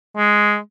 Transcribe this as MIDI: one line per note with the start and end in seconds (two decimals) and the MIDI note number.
0.17 0.58 56